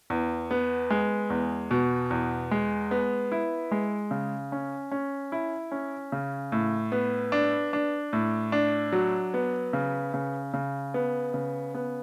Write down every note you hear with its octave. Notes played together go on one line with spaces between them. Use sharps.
E2
B3
G#3
E2
B2
E2
G#3
B3
E4
G#3
C#3
C#4
C#4
E4
C#4
C#3
A2
B3
D4
D4
A2
D4
F#3
B3
C#3
C#3
C#3
B3
C#3
B3